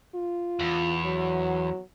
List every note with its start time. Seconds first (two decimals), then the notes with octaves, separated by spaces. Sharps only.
0.15 F4
0.60 E2
1.05 F#3